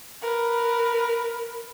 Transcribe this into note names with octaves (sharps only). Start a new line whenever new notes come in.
A#4 B4